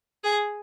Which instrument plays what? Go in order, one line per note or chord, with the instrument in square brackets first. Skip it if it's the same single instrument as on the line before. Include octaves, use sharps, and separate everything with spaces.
[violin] G#4